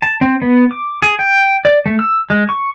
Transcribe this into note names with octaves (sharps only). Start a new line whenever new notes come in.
A5
C4
B3
D6
G#4
G5
D5
A3
E6
G#3
C#6